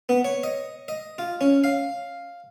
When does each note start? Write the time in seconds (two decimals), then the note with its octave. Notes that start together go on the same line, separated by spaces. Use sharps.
0.09 B3
0.25 C#5
0.43 D#5
0.88 D#5
1.18 F4
1.41 C#4
1.64 F5